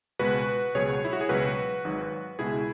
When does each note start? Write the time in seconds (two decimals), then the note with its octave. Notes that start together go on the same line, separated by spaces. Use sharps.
0.19 C#2 B2 G#3 F#4 B4
0.75 C#2 B2 F#3 G#4 C#5
1.05 E4
1.13 F#4
1.21 G#4
1.29 C#2 B2 F#3 F#4 B4
1.85 G#1 G#2 F#3
2.39 C#2 B2 G#3 E4 G#4